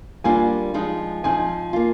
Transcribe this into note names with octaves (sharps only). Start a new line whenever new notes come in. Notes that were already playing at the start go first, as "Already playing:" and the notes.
G3 A#3 D4 F4 G#5
F3 G#3 D#4
F3 C4 D#4 G#5
A#3 F4